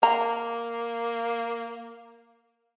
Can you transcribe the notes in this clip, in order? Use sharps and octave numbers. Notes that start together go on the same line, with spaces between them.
A#3 A#5